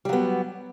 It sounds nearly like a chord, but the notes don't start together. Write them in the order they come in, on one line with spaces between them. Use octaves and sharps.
G3 F#3 B3